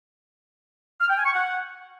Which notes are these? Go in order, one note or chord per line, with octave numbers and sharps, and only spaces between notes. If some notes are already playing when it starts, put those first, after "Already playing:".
F6
G5
G#5
C#6
F#5